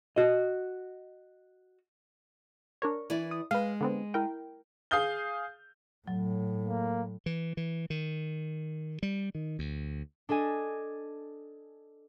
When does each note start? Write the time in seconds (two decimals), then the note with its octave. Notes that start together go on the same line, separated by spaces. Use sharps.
0.16 F#4 D#5
2.82 D4 A#4 C#5
3.10 E3 E4 D5
3.31 D#6
3.51 G#3 B4 F5
3.81 D3 B3 C4
4.14 E4 A#4 G5
4.91 G#4 F5 D#6 G6 G7
6.07 A2 F#3
6.65 A#3
7.26 E3
7.57 E3
7.90 D#3
9.03 G3
9.35 D#3
9.59 D2
10.29 D4 A4 D#5 G#5